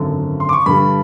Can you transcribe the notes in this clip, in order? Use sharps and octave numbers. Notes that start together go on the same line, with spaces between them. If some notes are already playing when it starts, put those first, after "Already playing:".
Already playing: G#1 F#2 D3
C6
D6
C#6
G2 D3 G3 B5